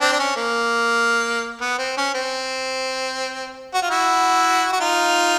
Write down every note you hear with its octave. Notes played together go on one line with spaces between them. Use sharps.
C4 D4
D4
C#4
A#3
B3
C4
C#4
C4
F#4
F4
E4 F#4
F#4
D#4 F4